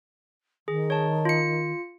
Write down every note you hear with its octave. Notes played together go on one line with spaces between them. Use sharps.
D#3 G#4
C#5 A5
F4 C#7